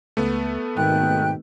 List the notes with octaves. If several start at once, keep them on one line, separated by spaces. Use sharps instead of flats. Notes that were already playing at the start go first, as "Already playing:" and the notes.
C#2 A3 B3
G#1 G#2 B2 D#3 G5 F#6